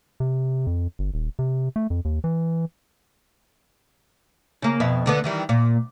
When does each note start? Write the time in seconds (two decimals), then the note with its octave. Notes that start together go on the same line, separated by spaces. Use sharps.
0.20 C3
0.67 F2
0.99 G1
1.14 D#1
1.39 C3
1.76 A3
1.90 F2
2.05 D#2
2.24 E3
4.62 C#3 A#3
4.80 F2 B2 E5
5.06 D2 D3 B3
5.24 D#3 E3 G3
5.49 A#2